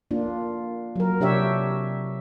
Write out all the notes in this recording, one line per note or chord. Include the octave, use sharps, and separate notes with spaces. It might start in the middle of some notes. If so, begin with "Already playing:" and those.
A#3 D4 F4
F#3 A#4
C3 D4 G4 C#5 E5